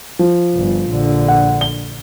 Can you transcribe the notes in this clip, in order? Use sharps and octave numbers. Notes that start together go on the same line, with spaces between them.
F3
G1
A#1 D3
F#5
G7